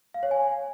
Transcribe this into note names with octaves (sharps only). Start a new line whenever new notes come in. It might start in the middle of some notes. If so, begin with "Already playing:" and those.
F5
C#5
G#5